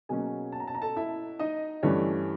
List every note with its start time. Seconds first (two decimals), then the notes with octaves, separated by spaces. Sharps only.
0.09 B2 F#3 A#3 C#4 G#4 G#5
0.52 A5
0.60 A#5
0.68 A5
0.75 A#5
0.82 A4 A5
0.97 E4 E5
1.39 D#4 D#5
1.83 G2 E3 A3 C#4 D4 C#5